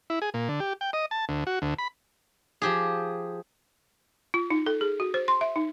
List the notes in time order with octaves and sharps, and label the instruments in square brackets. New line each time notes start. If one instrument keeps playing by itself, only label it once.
[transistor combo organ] E4
G#4
A#2
D3
G4
G5
D#5
A5
D2
F#4
D2
B5
[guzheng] F3 G4 G#4
[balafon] F4
D#4
A4
G#4
F#4
C5
C6
E5
D#4